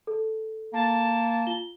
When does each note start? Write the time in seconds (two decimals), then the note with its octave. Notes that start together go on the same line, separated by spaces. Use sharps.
0.07 A4
0.74 A#3 A5
1.47 F4 G7